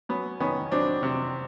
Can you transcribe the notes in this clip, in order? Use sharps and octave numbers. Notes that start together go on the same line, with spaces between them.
F#3 B3 C#4
D#3 B3 C#4
F#3 C4 D4
C3